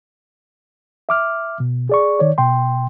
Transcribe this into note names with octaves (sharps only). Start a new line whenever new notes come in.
E5 D6 F6
B2
G#4 D5 C#6
D#3 C#5 D5
B2 G5 C6